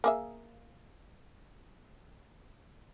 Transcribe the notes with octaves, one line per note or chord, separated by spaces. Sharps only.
A#3 G#4 E5